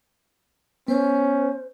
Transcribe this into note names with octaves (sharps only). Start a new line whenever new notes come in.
B3 C#4 C5